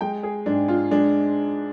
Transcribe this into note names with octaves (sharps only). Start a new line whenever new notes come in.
G#3 G5
G#4
G#2 D4
F4
G#3 D4